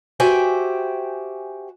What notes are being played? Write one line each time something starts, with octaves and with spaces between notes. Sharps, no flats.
F#4 G4 C5 E5 G5 G#5